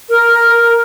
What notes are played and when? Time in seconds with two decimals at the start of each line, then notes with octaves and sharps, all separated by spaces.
0.08 A#4